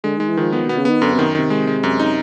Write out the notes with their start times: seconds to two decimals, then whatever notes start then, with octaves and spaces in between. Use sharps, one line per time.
0.04 D3 G#3
0.16 D#3 G#3
0.29 E3
0.37 D#3 F3
0.52 F3 B3
0.66 B2 B3
0.77 C#3
0.85 D#3 B3
1.02 F#2 D3
1.14 C3 D#3
1.35 C3 D#3
1.50 G#3
1.67 G#3
1.83 F#2
1.99 D#4